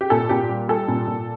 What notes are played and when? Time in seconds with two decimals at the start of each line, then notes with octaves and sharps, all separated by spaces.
0.01 G4
0.10 A#2 A4
0.29 A#2 G4
0.49 G3
0.68 G3 A4
0.88 A#2
1.07 A#2